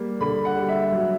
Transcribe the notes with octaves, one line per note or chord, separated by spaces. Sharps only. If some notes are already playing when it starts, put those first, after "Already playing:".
Already playing: G3 A#3
D3 B5
F#5
G3
E5
F#3